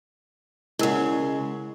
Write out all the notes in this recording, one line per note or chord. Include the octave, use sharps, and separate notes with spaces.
C#3 G#3 E4 A#4 F#5